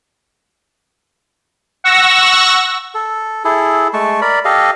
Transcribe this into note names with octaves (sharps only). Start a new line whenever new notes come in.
F#5 C#6 E6 A#6
A4
E4 G#4 A4
G#3 A3 A5 C#6
A#4 D5 B5
G4 A4 D#5 F5